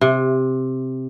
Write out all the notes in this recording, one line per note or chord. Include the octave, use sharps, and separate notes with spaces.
C3